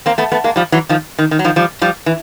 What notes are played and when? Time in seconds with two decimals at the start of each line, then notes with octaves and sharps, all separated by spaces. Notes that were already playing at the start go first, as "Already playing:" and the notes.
0.06 A#3 C4
0.18 A3 B3
0.32 A3 B3
0.44 G#3 A#3
0.56 F3 G3
0.72 E3 F#3
0.89 D#3 F3
1.19 D#3
1.31 D#3
1.39 F#3
1.44 D#3 F3
1.56 F3 G3
1.82 F3 G3
2.06 E3